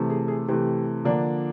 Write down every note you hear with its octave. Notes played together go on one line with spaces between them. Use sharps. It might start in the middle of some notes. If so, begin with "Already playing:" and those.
Already playing: C3 E3 A3
G#4
G#4
C3 E3 A3 G4
D3 F3 A#3 D4